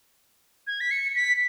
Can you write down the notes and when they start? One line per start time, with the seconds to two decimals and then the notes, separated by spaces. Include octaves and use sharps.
0.67 G#6
0.80 B6
0.91 C#7
1.16 B6